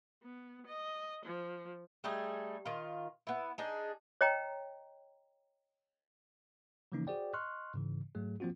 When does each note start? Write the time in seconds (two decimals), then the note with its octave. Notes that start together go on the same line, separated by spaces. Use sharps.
0.23 B3
0.66 D#5
1.25 F3
2.04 G3 A3 D#4 G#4
2.65 D#3 F4
3.27 B3 E4
3.58 D4 D#4 G#4
4.21 C#5 D#5 G5 A#5
6.92 C#3 E3 F3 A#3 C#4 D#4
7.07 F#4 G#4 C5 D5 G5
7.34 D#5 C6 C#6 F6 F#6
7.74 G#2 C#3 E3
8.15 G#2 F#3 A3 G#4
8.40 F3 A#3 C4 F4 F#4